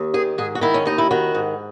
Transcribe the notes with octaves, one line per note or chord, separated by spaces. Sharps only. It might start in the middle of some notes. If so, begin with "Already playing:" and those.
Already playing: D#2
D#3 G#4
G#2 G#4
F#4
D#3 E4
C#4
D#2 D#4
E4
D#3 F#4
G#2